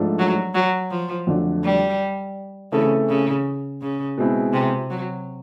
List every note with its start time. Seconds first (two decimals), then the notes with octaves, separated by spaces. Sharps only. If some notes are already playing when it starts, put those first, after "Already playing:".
Already playing: G#2 F3 A3 D4
0.19 F#3
0.55 F#3
0.90 F3
1.27 F2 D3 F#3 A3 D4
1.63 G3
2.72 C#3 E3 A3 C4 E4 A4
3.09 C#3
3.82 C#3
4.17 B2 G#3 C4 E4
4.53 C3
4.90 F#3